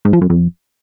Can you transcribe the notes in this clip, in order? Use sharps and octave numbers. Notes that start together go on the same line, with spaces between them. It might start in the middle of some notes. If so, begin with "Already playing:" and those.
G#2
F3
F#2
F2